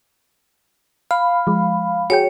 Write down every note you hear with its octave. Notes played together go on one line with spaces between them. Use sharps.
F5 B5
F3 G#3
F#4 G#4 C#5 G5